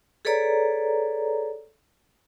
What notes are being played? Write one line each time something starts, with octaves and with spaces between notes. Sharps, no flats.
G#4 A4 B4 C#5 D5 A#5